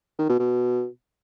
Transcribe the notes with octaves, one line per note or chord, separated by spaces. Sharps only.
D#3
B2
B2